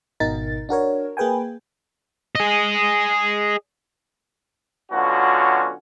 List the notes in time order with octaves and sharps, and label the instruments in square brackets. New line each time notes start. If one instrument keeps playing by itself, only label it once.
[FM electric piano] G#1 B2 D#4 A#4 A6
D4 F#4 A#4 C#5
A#3 G#4 B4 G5 G#5
[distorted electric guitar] G#4 D#5
[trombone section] B2 D3 F#3 C#4 F4 F#4